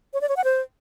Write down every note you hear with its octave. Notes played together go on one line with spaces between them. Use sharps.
C#5
D5
C#5
F#5
C5